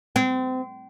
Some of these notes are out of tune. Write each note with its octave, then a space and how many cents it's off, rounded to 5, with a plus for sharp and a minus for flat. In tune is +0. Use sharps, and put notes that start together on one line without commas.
C4 -30